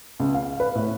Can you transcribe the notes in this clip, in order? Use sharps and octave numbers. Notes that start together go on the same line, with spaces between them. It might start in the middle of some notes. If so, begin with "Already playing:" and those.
C#2
F5
B4
A2